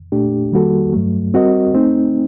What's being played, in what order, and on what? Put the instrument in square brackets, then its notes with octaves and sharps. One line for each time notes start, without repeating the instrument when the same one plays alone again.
[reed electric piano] A#2 A3 D4 G4
D#3 G3 A#3 F#4 A4
G2 F#3 A3
G3 C4 F#4 A#4 D#5
A3 C4 D#4